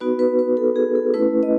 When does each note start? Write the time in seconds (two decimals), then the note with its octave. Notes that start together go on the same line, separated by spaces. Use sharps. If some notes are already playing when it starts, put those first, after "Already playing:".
0.01 B3 D#4 F#4 B4
0.19 B4
0.39 B4
0.57 A4
0.76 G#4
0.95 A4
1.14 A3 C#4 E4 B4
1.43 D#5